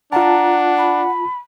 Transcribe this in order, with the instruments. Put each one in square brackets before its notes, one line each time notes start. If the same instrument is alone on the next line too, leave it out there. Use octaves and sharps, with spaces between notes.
[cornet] D4 [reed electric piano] F4 A5 [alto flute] F#5 [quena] A#5
[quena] B5